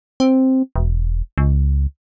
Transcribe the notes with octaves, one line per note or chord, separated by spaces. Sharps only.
C4
E1
C#2